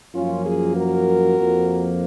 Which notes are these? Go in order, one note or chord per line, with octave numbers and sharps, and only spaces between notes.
F#2 F3 A#3 C#4 F4
F4 G#4
F#4 A#4
F2 F3 A#3